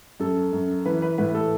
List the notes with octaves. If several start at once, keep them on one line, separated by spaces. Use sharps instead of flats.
F#2 A4
F#2
E3 B4
B4
A2 B4
A4